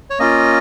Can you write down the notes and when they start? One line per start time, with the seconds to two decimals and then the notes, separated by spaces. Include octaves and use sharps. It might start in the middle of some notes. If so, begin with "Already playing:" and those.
0.10 C#5
0.19 A#3 C#4 F4 D#5